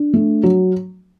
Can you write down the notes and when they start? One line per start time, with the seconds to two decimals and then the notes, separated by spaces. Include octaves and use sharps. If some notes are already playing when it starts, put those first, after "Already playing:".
Already playing: D4
0.13 A3
0.43 F#3